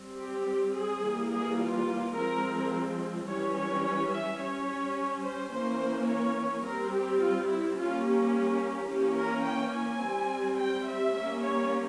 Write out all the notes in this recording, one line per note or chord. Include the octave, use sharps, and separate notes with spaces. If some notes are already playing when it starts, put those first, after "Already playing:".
Already playing: G3 C4
G4
G#4
E3 G3 A#3
G#4
F4
F3 G#3 C4 A#4
E3 G3 C#4 C#5
C#5
C#5
E5
G3 C#4 C#5
C5
E3 A#3 C#4 C5
C#5
G3 C4 A#4
G4
F4
E4
G3 A#3 C#4 F4
G4
E3 A#3 C#4 G4
A#4
G5
G#5
G3 C4
G5
E5
G3 A#3 C#4
C#5